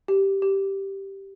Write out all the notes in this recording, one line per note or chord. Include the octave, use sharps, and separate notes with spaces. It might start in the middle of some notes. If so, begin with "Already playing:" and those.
G4
G4